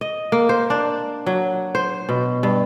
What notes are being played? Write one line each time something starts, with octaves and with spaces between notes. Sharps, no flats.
D#5
A#3
C5
D4
F#3
C5
B2
G2